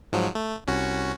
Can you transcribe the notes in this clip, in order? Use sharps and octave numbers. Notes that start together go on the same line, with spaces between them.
G#2 F3 F#3
A3
C2 C#4 F#4